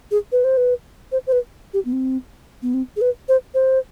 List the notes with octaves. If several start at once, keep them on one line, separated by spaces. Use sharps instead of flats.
G#4
B4
C5
B4
C5
C5
B4
G4
B3
C4
B3
C4
G#4
B4
C5
C5